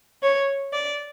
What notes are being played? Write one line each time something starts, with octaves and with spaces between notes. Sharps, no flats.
C#5
D5